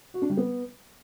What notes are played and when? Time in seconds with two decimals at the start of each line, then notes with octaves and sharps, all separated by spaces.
0.14 F#4
0.22 D4
0.30 G3
0.37 B3